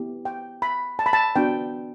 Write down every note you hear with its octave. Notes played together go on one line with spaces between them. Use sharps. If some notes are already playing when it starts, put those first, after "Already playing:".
Already playing: B3 E4 G4
G5
B5
A5
B5
A5
B3 D4 F#4 G5